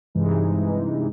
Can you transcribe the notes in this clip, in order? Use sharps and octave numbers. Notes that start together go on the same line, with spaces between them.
G2 C3 E3 G#3 D#4